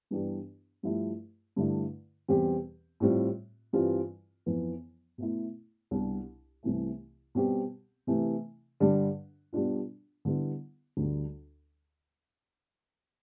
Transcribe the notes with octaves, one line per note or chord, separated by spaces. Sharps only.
G2 E3 B3 D4 G4
G2 F3 A3 E4 G4
G2 D3 A3 E4
E2 B2 G3 C4 G4
A2 G3 C4 F4
G2 E3 G3 C4 F4
F2 E3 B3
B2 A3 E4
C2 B2 G3 D4 G4
C2 C3 E3 A3
B2 G3 C4 G4
C3 E3 A3
G2 D3 G3 D4
B2 G3 D4 F4
D3 G3 B3 E4
D2 D3 G3 D4